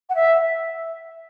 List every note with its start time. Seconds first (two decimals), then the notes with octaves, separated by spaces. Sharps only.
0.09 F#5
0.15 E5